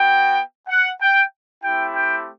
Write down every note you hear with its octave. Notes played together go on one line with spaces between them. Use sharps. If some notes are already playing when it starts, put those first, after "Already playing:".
Already playing: B3 F#4 G5
F#5
G5
A3 C4 E4 G4 G5
G5